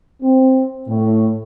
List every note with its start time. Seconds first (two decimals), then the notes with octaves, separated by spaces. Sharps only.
0.21 C4
0.88 A2